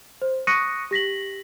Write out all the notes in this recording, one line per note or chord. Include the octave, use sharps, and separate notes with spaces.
C5
C#6 D#6 F#6 A#6 C#7 D#7
G4 A#6 B6 F#7